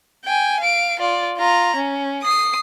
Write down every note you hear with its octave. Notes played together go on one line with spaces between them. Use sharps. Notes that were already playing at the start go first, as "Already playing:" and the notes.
G5 G#5
F5 D7
F4 D5
F4 A#5
C#4
D#6 C7